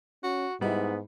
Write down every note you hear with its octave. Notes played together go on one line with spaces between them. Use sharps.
C#4 F#4
G#2 G3 B3 D#4 E4